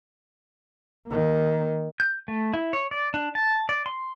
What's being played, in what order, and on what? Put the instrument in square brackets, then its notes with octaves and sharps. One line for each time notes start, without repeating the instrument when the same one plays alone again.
[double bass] D#3 A#3
[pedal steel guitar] G6
A3
E4
C#5
D5
D4
A5
D5
C6